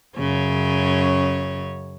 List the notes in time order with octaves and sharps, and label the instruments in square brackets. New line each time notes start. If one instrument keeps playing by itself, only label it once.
[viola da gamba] F#2 C#3 C#5